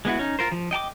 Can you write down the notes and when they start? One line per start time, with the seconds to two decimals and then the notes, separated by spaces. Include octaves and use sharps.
0.05 G#3 B3 E4 F#4
0.19 C#4 D#4
0.39 F4 A#4 C5
0.52 F3
0.71 D#5 G5 A5 D6